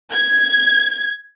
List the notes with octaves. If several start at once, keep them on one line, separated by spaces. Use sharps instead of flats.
G#6